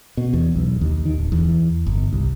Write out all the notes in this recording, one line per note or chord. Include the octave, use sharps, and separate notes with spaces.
B2
E2
B1
D#2
D#3
D1
E2
G1
C2